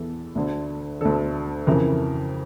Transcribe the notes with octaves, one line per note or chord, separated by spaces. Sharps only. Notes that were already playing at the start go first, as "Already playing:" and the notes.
Already playing: E2 E3 A4
D2 D3
D2 D3 A4
F2 C#3 E3 A#4